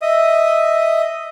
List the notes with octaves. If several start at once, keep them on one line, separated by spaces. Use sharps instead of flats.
D#5 E5 D#6